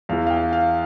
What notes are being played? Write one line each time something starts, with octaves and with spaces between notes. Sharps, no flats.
E2 E3 F5
F5
G5
F5